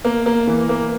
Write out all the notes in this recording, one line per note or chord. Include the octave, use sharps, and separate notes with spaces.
A#3
A#3
E3
A#3